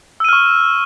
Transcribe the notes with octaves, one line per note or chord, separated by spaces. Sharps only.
C#6 E6 F6 D#7